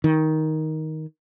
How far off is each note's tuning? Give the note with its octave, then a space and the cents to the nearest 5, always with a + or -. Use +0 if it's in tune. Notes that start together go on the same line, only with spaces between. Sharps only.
D#3 +10